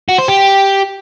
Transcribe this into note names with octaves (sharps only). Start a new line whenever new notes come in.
F#4
C5
G4